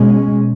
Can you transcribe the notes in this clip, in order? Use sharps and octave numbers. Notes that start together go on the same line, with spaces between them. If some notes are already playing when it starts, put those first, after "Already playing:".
Already playing: B2 G#3 C#4